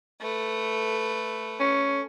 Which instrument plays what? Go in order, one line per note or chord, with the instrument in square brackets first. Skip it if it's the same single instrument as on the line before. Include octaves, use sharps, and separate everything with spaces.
[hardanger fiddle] A3 B4
[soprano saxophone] C#4